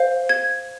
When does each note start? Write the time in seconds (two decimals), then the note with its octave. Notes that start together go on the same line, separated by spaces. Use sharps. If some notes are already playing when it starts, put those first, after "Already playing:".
Already playing: C5 F5
0.29 G#6